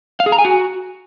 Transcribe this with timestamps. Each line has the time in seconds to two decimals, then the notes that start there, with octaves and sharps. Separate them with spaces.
0.20 F5
0.26 G#4
0.32 A#5
0.39 G#5
0.45 F#4